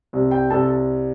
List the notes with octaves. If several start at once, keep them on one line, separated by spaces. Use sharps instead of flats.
C2
G5
C2 A4 A5